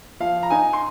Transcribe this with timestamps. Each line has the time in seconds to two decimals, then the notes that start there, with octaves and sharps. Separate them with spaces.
0.20 F3 F5
0.43 A#5
0.50 D#4 G#5
0.73 C6